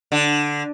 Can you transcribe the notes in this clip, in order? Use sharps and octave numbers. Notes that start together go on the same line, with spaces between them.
D3